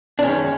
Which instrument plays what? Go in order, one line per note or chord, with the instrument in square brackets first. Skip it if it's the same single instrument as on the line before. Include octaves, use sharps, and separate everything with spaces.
[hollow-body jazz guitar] D4
F#2 D#3 G#3 C#4